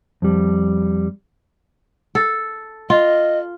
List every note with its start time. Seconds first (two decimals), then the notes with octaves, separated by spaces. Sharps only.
0.22 F2 G3
2.15 A4
2.90 F4 D#5